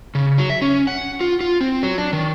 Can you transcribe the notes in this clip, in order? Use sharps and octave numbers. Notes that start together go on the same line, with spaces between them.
C#3
F#3
E5
C#4
F#5
F4
F4
C4
F#3
D4
D#3